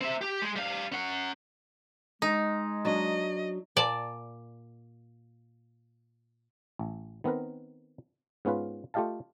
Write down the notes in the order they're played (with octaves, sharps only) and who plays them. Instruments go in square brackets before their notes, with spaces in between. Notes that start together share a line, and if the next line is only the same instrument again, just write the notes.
[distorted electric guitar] C4 E5
G4
G#3
G3 F5
C#4 F#5
[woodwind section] G#3 [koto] D#4
[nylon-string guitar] F#3 D4 [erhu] D#5
[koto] A#2 D5 A5
[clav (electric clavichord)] A1
D#3 B3 C4 A#4 B4
G#2 B3 C#4 F4 B4
A3 F4 G4 D#5 F5 A5